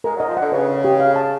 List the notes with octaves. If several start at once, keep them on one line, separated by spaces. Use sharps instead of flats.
G#3 A#4
F#3 D#5
F3
D3 F#5
C#3 B4
D#5
G4
F5
A5